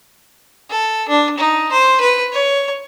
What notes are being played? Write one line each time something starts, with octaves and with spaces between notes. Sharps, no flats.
A4
D4
D#4
C5
B4
C#5